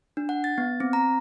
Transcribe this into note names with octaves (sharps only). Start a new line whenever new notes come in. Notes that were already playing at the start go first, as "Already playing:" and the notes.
D4
F#5
A6
B3
C4
A#5